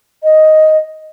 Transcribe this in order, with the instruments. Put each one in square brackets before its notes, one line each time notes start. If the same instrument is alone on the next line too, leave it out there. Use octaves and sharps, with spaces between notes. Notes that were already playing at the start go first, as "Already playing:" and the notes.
[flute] D#5